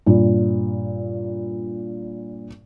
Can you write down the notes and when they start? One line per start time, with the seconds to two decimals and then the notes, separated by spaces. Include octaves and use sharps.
0.06 G2 A#2